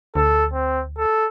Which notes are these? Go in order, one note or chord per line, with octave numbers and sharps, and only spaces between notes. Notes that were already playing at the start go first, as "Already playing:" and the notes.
D2 A4
C4
A4